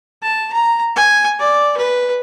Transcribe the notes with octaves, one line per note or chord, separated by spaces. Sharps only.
A5
A#5
G#5
D5
B4